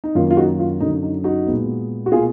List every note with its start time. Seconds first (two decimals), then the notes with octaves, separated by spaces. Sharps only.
0.04 D#4
0.15 F#2 D#3 A#3 F4
0.30 F4
0.37 D#4 F#4
0.59 F4
0.81 F#2 D3 F#3 D#4
1.03 D#4
1.24 D#4 F#4
1.46 A#2 G#3 B3
2.06 F#4
2.12 B2 A#3 F4 G#4